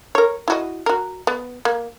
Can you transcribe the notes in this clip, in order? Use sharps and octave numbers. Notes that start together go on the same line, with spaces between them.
A#4 C#5
E4 F#4 D#5
F#4 A#4
B3
A#3